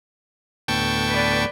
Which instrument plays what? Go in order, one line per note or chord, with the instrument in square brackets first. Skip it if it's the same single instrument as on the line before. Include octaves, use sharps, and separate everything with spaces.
[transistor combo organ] D2 A2 B3 [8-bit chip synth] G5 A5 C#6
[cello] B4 D5